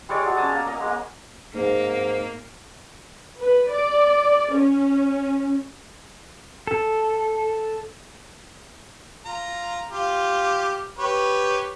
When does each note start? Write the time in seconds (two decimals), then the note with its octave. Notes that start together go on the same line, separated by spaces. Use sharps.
0.09 G3 G#3 C#5 D5
0.23 F#3 G#3
0.37 C#4 C#5 A5 D#6
0.51 A#3 A#4
0.65 A#3 D#5
0.80 G#3 A#3
1.54 G#2 A#3
3.40 B4
3.70 D5
4.52 C#4
6.67 A4
9.25 F4 A#5
9.90 F4 G4
10.99 G4 B4 C#5